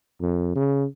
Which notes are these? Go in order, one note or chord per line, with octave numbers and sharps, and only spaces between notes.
F2
C#3